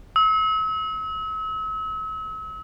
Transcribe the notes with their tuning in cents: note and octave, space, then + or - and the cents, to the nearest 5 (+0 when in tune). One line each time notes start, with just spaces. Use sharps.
E6 -40